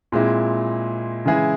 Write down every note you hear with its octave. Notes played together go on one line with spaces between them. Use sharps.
A#2 G#3 C4 E4
C#3 E3 G#3 E4 G#4